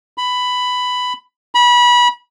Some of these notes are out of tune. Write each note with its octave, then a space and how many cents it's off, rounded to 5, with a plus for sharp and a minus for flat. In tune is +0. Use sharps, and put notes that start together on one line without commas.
B5 +10
B5 -25